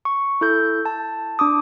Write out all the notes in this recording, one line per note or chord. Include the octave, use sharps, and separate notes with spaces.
C#6
E4 A4 G6
A5
D4 D6 D#6